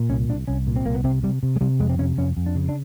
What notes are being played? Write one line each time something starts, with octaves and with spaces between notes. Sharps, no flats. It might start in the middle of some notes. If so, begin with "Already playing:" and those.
Already playing: A#2
C2 C#4
C2 D4
C2 C#4
A#2
C4
C2 A#3
B3
C3 C4
C3 G3
C3
G#3
C3 G3
F2 G#3
C4
C3 C#4
F2 C#4
F2
D4
C#3
D4